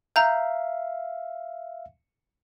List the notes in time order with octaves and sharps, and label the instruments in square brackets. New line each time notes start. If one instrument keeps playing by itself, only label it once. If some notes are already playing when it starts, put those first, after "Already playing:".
[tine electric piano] E5 F5 [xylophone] A#5 G6